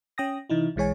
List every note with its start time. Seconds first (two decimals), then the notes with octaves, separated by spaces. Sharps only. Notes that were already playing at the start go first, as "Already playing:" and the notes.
0.18 C#4 G5 D#6 A#6
0.50 C3 E3 D#4 E4
0.76 B1 E3 G#3 C#5 G#5